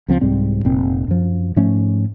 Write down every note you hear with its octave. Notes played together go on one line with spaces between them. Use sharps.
C#2 F3 C4
C2 G#2 G3 C4
F1 A#2 C4
F#2 F3
G#2 F3 A3 C#4